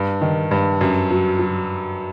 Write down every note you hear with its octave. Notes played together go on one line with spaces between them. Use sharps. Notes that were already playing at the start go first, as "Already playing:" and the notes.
Already playing: G2
D#3
G2
F#2
F#3
F#3